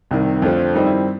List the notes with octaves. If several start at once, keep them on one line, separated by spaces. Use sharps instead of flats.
C2 C3 D#3
F2 D3 F3 A3 C4
G2 D#3 G3 C4 D#4
E4